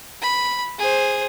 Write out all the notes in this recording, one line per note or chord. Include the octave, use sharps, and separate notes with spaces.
B5
G#4 C5